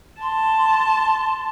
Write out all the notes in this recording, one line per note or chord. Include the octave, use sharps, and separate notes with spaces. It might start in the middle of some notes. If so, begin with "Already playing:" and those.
A5 C6